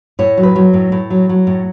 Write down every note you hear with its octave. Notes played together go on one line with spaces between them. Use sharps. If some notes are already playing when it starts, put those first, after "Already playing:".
A2 C#5
F#3
B4
F#3
A2
A2
F#3
F#3
A2